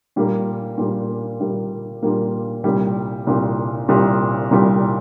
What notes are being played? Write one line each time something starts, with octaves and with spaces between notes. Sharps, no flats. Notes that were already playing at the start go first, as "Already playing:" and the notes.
A#2 G3 A#3
A#2 G3 A#3
A#2 G3 A#3
A#2 G3 A#3
C2 A#2 G3
C2 A#2 G3
C2 A#2 G3
C2 A#2 G3